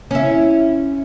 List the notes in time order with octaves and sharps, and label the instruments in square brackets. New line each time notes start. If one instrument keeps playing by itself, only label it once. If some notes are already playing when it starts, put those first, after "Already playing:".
[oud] C#4 E4